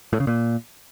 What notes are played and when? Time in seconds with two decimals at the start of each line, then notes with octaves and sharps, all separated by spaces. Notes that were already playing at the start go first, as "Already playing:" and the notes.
0.13 A2
0.20 C#3
0.27 A#2